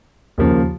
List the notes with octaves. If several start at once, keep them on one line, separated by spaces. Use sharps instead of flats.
D#2 C#3 F3 A#3